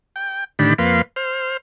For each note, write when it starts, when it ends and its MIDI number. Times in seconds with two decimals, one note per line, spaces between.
0.16 0.44 79
0.59 0.74 45
0.59 0.74 50
0.59 0.74 51
0.59 0.74 62
0.59 0.74 67
0.59 0.74 83
0.78 1.02 41
0.78 1.02 58
0.78 1.02 71
0.78 1.02 77
0.78 1.02 84
1.16 1.57 72
1.16 1.57 89